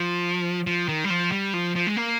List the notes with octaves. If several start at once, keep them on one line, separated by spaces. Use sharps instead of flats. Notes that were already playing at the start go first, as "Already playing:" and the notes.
Already playing: F3
F3
D#3
G3
F3
G3
F3
F3
G#3
A#3